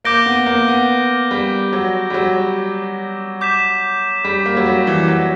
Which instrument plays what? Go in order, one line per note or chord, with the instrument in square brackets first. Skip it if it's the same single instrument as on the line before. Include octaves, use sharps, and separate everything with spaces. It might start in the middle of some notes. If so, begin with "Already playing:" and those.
[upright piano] A#3 [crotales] D6 G6 A#6 D7 G7
[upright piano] B3
A#3
B3
G3
F#3
G3
F#3
[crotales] D6 G6 B6 E7
[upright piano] G3
A#3
F#3
G3
E3
F#3